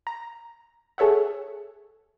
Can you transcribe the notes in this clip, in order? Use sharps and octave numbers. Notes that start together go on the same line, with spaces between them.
A#5
G#4 A4 C#5 E5 F#5